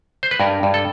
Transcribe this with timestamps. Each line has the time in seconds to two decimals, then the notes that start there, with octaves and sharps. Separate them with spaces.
0.23 C5
0.31 B4
0.40 G2 A#4
0.63 G2
0.74 A4